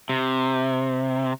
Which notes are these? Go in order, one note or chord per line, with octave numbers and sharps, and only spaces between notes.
C3